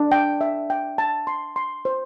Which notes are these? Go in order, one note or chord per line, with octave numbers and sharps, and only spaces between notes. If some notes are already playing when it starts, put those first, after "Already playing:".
Already playing: D4
G5
E5
G5
A5
C6
C6
C5